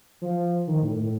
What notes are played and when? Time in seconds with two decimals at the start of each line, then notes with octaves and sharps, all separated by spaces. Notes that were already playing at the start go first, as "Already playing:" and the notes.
0.21 F3
0.67 D#3
0.82 A2
0.98 A2